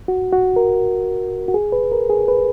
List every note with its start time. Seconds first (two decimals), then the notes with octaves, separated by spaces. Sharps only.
0.08 F#4
0.33 F#4
0.56 A#4
1.48 F#4
1.54 G#4
1.72 B4
1.92 A#4
2.10 G#4
2.28 B4